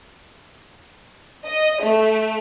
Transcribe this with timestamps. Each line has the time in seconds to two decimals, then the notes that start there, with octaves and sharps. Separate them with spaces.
1.46 D#5
1.81 A3